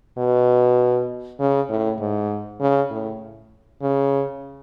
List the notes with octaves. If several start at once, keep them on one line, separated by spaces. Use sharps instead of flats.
B2
C#3
A2
G#2
C#3
A2
C#3